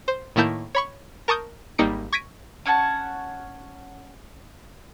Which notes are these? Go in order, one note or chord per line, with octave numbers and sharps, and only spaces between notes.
C5
A2 D#3 A#3 E4 A5 G6
C#5 B5 C#6
A#4 A5 C#6 D#6 G6
G#1 G3 A#3 D#4 C#7 D7
C#6 G#6 A#6 B6 D7 D#7
C#4 C#5 F#5 A5